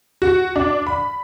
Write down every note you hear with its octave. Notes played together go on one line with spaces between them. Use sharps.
F#4
D4
B5